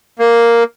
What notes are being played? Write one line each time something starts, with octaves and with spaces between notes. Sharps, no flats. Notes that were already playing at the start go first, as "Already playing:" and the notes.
A#3